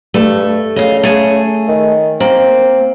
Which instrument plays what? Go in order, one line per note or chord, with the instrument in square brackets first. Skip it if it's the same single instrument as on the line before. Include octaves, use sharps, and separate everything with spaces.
[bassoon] G2 [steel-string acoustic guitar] A3
[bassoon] C#3 [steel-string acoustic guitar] D#5 F5
[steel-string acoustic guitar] A3 G#4
[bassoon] D#3
[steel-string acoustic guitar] A#3 [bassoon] C4